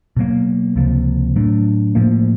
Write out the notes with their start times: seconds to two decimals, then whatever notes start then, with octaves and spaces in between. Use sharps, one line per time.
0.17 B2 F#3 A#3
0.76 C#2 C3 F3 A#3
1.36 A2 F#3 A3 D4
1.95 A2 F3 A#3